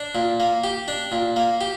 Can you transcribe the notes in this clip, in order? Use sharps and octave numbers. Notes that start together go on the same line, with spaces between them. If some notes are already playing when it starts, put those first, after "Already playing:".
Already playing: D4
A#2
A#3
G4
D4
A#2
A#3
G4